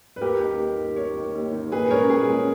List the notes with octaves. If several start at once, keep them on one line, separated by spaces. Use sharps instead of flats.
B4
D#2 G4 A#4
D#3 A#3
D#2
D#3 A#3
D#2 A#4 C#5
D#3 A#3
D#2
D#3 A#3
A#2 G#4 B4
G#3 C#4 A#4 C#5
A#2 G#4
G#3 C#4